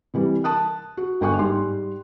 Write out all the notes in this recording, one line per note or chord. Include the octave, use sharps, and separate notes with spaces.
C3 E3 G3
A5 D#6 F#6
F#4
G1 G5 G#5 C#6 F#6
G#2 G3 C6